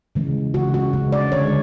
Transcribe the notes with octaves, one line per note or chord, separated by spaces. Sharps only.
C#3 E3 G#3
C#3 G#3 F#4
F#4
C#3 G#3
D5
D3 G#3 C#5